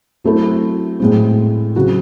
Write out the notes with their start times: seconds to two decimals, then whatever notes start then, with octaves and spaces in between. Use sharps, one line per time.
0.24 F#3 A3 C4 E4 A4
1.00 A2 G#3 C4
1.76 C#3 F#3 C4 F#4